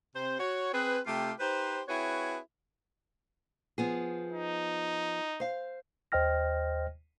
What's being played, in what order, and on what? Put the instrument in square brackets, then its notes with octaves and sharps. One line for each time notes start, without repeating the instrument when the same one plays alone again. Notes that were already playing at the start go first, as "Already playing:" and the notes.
[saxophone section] C3 C5
F#4 C#5
C4 G#4 B4
C3 A3 F4 G4
D#4 G4 B4 C5
C4 E4 F#4 G#4 B4 C#5
[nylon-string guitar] F3 B3 G#4
[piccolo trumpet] D#4
[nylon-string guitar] C5 F5
[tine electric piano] D#2 C5 D#5 G5 F6 A#6